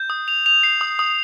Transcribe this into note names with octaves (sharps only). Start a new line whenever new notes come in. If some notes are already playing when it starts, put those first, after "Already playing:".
Already playing: G6
D#6
F7
F7
C7
D#6
D#6